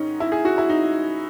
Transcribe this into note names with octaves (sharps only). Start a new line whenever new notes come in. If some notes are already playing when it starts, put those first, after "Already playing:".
Already playing: G#2 D#3 C#4 D#4
E4
G#4
F#4
E4
D#4